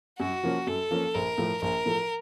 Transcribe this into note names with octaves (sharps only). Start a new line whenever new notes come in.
F#2 F#4
F3 A#3 C#4
F#2 A4
F3 A#3 C#4
A#1 A#4
A2 F3 A3
A#1 A#4
A2 F3 A3